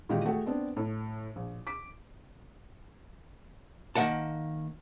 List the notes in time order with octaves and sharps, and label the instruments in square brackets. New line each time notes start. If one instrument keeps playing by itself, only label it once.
[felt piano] A#2 D#3 E3 G#3 F#4 G4
A3 F#4 G#4 A4 F#5 G5
B3 C4 D4
A2
A#1
D6 B6
[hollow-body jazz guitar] D#3 F3 A#3 F#5 A5